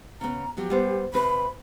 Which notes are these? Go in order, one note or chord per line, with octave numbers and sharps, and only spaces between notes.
C#3 B3 A#5
F3 F#3 B3 G4
G3 B3 C5
C3 C4 B4 B5